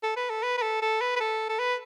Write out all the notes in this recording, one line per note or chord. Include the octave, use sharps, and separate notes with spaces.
A4
B4
A4
B4
B4
A4
A4
B4
B4
A4
A4
B4